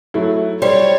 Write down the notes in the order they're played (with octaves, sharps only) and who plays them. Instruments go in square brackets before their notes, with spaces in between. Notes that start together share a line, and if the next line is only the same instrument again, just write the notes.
[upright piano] F#3 A3 E4
[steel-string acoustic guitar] G3 [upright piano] C5 [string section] C#5